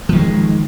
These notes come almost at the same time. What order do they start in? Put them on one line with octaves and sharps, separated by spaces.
F3 D#3 G#3